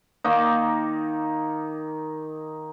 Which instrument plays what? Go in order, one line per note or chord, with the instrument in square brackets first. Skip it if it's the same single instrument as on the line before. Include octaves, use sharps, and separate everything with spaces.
[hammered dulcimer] D#3 A#3 D#4